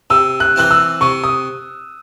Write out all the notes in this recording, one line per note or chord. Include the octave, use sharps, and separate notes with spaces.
C3 E6
F#6
E3 C4 E4 F#6
E6
C3 C#6
D#6